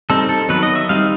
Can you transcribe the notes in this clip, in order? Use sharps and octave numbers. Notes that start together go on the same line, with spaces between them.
G3 C4 D#4 A4
A4
D#3 F#3 B3 B4
D#5
E5
G3 C4 D#4 F5